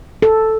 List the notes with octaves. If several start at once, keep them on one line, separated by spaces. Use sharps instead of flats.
A4